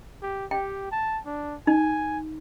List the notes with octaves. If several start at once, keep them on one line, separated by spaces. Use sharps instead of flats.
G4
G4 G5
A5
D4
D#4 G#5